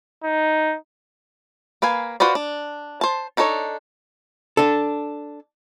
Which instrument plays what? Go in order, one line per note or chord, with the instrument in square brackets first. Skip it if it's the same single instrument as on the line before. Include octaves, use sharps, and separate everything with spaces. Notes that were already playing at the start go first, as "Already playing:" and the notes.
[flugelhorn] D#4
[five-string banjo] A#3 B4 F5 G#5
F4 F#4 B4 C5 D5
D4
C5 A5
D4 D#4 A4 C5 C#5
[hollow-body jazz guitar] D4 A4